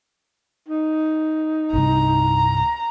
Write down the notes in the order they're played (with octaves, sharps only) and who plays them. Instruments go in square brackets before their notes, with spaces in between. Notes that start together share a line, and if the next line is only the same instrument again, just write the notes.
[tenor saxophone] D#4
[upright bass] C2 G2 [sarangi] A#5